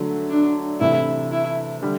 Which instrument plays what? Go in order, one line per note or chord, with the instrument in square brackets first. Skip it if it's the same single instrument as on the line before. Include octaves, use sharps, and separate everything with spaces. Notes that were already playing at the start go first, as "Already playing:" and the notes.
Already playing: [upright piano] D3 F#3 A3 D4
[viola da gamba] D4
[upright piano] C3 E3 A3 [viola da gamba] E4
[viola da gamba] E4
[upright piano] D3 G3